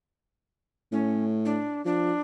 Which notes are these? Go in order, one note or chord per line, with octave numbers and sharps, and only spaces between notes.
A2 C#4
D4
F3 D4